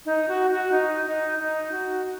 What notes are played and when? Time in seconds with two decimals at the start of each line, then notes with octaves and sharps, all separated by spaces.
0.06 D#4
0.29 F#4
0.51 F#4
0.72 D#4
1.06 D#4
1.39 D#4
1.71 F#4